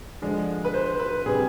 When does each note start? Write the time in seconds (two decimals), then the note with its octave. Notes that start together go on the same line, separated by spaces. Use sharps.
0.22 D3 F3 G#3 D4
0.64 B4
0.74 C5
1.00 B4
1.26 C3 G3 D4 G#4